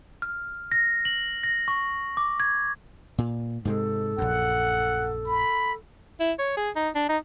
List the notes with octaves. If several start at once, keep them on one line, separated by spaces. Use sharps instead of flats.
F6
A#6
F#7
A#6
C#6
D6
G#6
A#2
G#2 C3 G#3 A4
A#1 F#2 F#5
B5
E4
C#5
G#4
D#4
D4
D#4